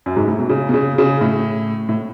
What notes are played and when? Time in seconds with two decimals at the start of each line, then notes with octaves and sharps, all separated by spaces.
0.06 F#2
0.17 G#2
0.28 A2
0.39 B2
0.49 C#3
0.69 B2
0.74 C#3
0.98 C#3
1.21 A2
1.89 A2